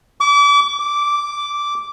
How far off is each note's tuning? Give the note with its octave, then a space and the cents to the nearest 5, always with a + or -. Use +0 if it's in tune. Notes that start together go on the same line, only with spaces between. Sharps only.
D6 -35
D6 -10